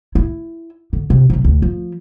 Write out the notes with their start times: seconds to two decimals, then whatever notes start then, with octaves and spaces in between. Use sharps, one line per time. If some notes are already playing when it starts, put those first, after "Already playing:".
0.15 E4
0.93 D3
1.10 C3
1.30 C3 F#3
1.44 D2
1.62 F3